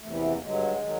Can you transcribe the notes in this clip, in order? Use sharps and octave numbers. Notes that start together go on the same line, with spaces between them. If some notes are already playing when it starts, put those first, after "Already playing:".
E2 C3 E3 A3
B3
A#3
A#3
G2 D3 F#3 G#3
D#3 F#3